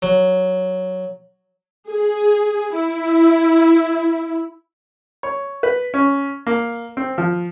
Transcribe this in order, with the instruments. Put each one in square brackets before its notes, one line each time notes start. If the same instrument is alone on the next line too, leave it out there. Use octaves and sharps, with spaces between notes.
[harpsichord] F#3
[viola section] G#4
E4
[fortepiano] C#5
B4
C#4
A#3
C4
F3